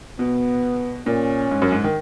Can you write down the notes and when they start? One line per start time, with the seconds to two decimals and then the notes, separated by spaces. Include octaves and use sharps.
0.19 B2 B3
1.06 A#2 C#4
1.51 G#2
1.62 F#2
1.72 G#2
1.84 D#3